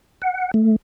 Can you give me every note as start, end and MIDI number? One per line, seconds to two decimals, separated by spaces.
0.22 0.51 78
0.54 0.76 57